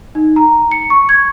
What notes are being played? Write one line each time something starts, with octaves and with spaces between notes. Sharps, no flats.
D#4
A#5
C#7
C#6
G#6